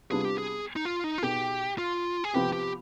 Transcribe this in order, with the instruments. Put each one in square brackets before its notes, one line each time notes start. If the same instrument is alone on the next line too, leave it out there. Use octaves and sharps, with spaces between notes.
[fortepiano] C3 G3 B3 D4 F4 [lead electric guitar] G#4
[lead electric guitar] G4
G#4
D#4
F4
D#4
F4
[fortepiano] B2 B3 D#4 G#4 [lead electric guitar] G4
[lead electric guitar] F4
G#4
[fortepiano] C3 F3 B3 [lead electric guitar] G4
[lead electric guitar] G4